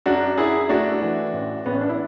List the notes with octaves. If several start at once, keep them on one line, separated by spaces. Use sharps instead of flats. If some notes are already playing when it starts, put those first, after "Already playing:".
F#2 D4 F#4
F#2 E4 G#4
A3 D4 F#4
E3
A1
A1 B3
C#4
D4
E4